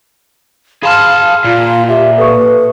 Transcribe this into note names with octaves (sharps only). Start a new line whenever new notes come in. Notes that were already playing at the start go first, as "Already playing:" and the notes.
G#4 F5 A5 B5 C6 F6
A#2 F4
G4 E5
A4 B4 C#6